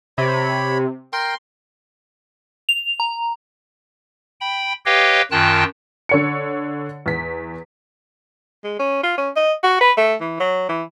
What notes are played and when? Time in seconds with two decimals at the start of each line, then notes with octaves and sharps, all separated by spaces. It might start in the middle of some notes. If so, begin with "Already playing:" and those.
0.18 C3 C#5 B5
1.13 A#4 G5 C6
2.69 F7
3.00 A#5
4.41 G5 B5
4.86 G4 B4 C#5 D#5 F5 G5
5.31 F#2 D#3 F4 G5 A5 F#6
6.09 D3 C#5 C#7
7.06 E2 B6
8.64 G#3
8.79 C#4
9.03 F4
9.18 C#4
9.36 D#5
9.63 F#4
9.81 B4
9.97 A3
10.21 E3
10.40 F#3
10.69 E3